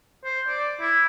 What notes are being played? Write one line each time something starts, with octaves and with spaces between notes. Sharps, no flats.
C5
D5
E4